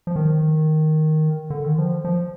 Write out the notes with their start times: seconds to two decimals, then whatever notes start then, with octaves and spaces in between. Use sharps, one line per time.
0.07 F3
0.16 D#3
1.50 D3
1.64 D#3
1.78 F3
2.05 F3